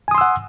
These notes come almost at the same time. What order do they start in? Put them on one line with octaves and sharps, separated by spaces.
G#5 D#6 C6 E6 F#5